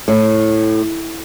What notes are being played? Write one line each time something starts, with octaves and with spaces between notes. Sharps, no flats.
A2